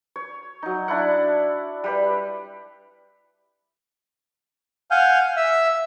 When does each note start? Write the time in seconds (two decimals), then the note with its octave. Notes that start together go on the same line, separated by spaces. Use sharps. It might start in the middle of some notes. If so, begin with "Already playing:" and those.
0.16 C#5
0.62 F#3 D#4
0.88 D4 E4 F#5
1.84 G3 G4 B4
4.91 F5 F#5 G#5 F6 G6
5.37 E5 E6